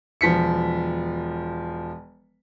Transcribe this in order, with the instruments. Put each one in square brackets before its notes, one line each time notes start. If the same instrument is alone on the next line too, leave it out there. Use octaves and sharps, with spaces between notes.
[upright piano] E1 F3 B6 C#7